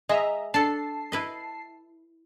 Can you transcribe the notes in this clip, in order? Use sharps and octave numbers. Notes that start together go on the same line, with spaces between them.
G#3 D#5 E5 A#5
D4 A4 A5 C7
E4 B4 D#5